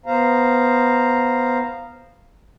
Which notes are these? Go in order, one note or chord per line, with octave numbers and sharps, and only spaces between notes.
B3 C5 F5 A#5